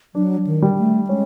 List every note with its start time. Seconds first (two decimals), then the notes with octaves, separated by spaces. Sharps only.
0.15 F#3 D4
0.47 D#3
0.62 G3
0.78 A3
1.09 G#3 C#4